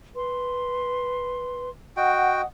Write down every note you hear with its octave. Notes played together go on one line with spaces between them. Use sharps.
B4 C6
F#4 D#5 F#5 G5 D#6